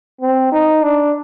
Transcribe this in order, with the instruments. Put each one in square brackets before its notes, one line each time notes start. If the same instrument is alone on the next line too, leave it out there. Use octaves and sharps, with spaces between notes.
[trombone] C4
D#4
D4